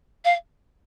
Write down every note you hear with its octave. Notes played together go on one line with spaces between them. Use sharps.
F5